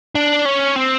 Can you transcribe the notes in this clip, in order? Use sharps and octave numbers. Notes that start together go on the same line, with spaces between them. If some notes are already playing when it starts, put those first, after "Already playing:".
D4
C#4
C4